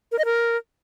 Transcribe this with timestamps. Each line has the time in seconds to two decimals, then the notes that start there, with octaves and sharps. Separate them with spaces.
0.12 A#4
0.18 D#5
0.25 A#4